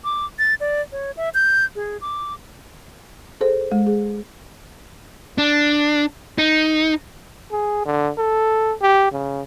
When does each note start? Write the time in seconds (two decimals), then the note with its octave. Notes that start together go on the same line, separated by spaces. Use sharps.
0.04 D6
0.39 A6
0.60 D5
0.92 C#5
1.17 E5
1.34 G6
1.76 G#4
2.01 D6
3.41 G#4 A4 C5
3.72 G#3
3.87 G#4
5.38 D4
6.38 D#4
7.51 G#4
7.85 D3
8.18 A4
8.82 G4
9.12 C#3